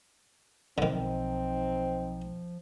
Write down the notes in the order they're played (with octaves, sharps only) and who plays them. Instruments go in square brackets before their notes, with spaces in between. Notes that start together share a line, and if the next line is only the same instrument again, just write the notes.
[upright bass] B1 [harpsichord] D3 D#3 [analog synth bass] F3 [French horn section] C4 D#4